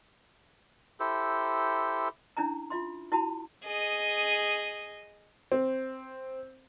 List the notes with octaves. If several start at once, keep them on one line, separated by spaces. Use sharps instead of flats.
E4 G4 A4 C5
C#4 D4 E4 G#5 A#5
F4 E5 C6
E4 F#4 A5 B5
G#4 D#5
C4